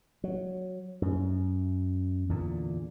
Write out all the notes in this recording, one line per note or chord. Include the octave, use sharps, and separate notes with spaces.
F#3
F#2
E2 A#2 D3